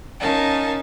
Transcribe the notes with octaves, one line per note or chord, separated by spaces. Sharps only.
C#4 D#4 A#4 F5 A5